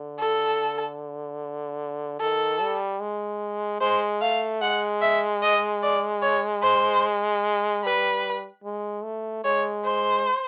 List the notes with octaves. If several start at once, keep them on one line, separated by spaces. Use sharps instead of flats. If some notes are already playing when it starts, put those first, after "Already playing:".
Already playing: D3
A4
D#3 A4
G3
G#3
G#3 C5
A3 F5
G#3 F#5
E5
D#5
D5
C#5
C5
G3 B4
G#3
A3
G#3 C#5
C5